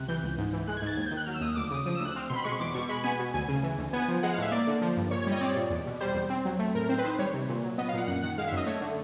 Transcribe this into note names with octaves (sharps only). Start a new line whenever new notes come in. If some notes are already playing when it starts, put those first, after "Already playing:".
Already playing: C#2 C3 F#6
E3 G6
C#2
G#2
E3
G#3 F#6
G#6
G#2
A6
D#2 G#6
G6
D#3
F#6
F#3 F6
E6
D#2 D#6
D2 D6
C#3 D#6
F3 D#6
E6
D2 F#6
C4 F6
B2 C6
B5
G#3 C#6
E2 D6
B2 C#6
G#3 B5
B3 G#5
B2
D2 G#5
C#3
E3
D2
B3 G#5
F3
G#3 F#5
F5
A2 E5
A#3 D5
D3
F3
G2
A#2 C#5
C#5
G3 D#5
C#5
C4 D5
A#2
E2
B2
G3 C5
E2
C4
F#3
A3
A2 A#4
C4 C5
B4
D#3 C5
G3 C#5
C3
A#2
F#3
B3 D#5
F5
A#2 F#5
F#2 F#5
D#3 F#5
G#3 F5
E5
F#2 D#5
A3 C#5
D3